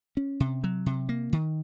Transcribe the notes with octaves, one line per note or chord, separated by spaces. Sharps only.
C#4
C3
F#3
C3
A#3
D#3